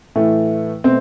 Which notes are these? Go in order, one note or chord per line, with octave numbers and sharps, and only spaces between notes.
A2 E3 A3
B2 A3 C4